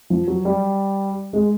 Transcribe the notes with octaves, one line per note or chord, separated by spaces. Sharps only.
F3
F#3
G3
G#3